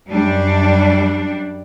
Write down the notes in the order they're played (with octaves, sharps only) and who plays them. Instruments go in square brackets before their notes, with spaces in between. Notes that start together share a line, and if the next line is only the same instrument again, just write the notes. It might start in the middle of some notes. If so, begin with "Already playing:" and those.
[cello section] F#2 G3 D4